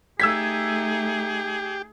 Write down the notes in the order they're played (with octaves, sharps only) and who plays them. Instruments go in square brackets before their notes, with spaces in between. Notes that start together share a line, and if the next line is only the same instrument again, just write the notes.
[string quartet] A3 D#4 [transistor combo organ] G4 [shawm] G#4 [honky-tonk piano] E6 G#6 B6